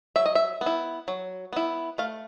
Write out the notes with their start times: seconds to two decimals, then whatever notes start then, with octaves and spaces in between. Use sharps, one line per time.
0.16 F#3 E5
0.26 D#5
0.35 E5
0.61 B3
0.66 E4
1.08 F#3
1.53 B3 E4
1.98 A3 F5